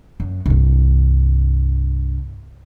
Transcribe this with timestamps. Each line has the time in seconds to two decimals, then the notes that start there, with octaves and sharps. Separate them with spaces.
0.20 F#2
0.46 C2 G2